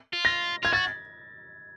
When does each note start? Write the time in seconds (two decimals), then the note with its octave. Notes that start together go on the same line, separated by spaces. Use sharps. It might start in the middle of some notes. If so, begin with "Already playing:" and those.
0.13 F4
0.25 A#6
0.63 F4 G#6
0.73 F#4 A6